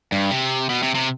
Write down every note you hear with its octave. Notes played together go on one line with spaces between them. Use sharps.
G2
C3
B2
C3
C3